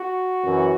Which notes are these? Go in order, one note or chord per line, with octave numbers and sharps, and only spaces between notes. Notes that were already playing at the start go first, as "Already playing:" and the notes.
Already playing: F#4
F#2 E3